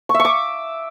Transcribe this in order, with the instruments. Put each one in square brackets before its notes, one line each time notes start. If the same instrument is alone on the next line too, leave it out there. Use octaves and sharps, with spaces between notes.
[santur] C#6
E5
C#6
D6